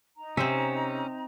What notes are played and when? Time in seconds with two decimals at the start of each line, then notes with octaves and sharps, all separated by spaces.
0.16 D#4 A#5
0.37 C3 C4 C#4 C5 E5